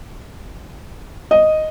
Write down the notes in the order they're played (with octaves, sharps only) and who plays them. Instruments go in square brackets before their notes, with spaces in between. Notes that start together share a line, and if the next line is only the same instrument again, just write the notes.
[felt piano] D#5